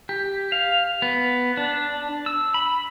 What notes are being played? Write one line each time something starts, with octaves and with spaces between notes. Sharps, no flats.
G4
F5
B3
D4
E6
B5